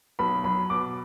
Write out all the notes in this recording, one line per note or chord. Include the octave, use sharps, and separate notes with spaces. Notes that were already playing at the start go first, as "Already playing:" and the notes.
B1 B5
F#3 B5
B2 D6